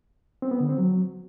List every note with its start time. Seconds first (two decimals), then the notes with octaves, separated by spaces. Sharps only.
0.42 C4
0.51 B3
0.60 D3
0.69 C4
0.78 F#3